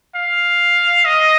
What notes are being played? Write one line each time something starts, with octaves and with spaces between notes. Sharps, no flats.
F5
D#5